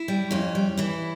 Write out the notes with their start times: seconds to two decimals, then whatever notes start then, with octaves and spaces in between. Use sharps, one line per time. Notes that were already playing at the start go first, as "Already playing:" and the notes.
Already playing: E4
0.08 G3
0.31 F2 C#4
0.55 G3
0.77 E3 E4